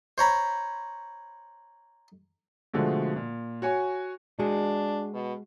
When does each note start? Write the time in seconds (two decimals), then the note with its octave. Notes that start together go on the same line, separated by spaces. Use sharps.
0.18 C5 C#5 A#5 B5
2.74 B2 D3 F3 G#3 A3
3.16 A#2
3.62 F#4 C#5 G#5
4.39 G#3 D4 F#4 G#4
5.13 B2